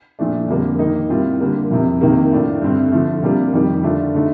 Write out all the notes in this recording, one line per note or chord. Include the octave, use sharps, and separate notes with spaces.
A#2 F3 A3 D4
F2 D3 G3 A#3
D#3 A#3 D#4
A2 G3 C4 F4
D3 G3 A#3
F2 C3 F3
C3 D#3 A#3
A2 A3 D4 F4
G2 D3 A3 C4
D3 F3 A3
C3 G3 A#3 D4 F4
F2 D#3 G3
D3 A3 D4 F4
D3 A3 D#4